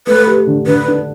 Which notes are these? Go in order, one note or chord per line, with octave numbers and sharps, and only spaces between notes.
A3 B4
G4
D3
D3 B4
D4